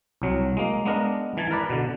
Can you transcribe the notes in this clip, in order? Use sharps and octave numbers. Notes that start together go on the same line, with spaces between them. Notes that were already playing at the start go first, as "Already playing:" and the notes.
C2 F#3
G#3 A#3
G#3 B3 D4 A#4
E3 G#5 A5
A#4 B4 D5
B2 D3